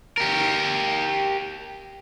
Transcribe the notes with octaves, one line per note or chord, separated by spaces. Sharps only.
G4 A#4